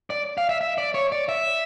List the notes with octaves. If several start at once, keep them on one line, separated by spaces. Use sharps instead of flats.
D5
F5
E5
E5
D5
C#5
D5
E5